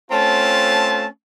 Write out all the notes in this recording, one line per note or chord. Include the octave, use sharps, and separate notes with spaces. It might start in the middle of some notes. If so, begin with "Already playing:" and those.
A3 C4 C#4 F4 A5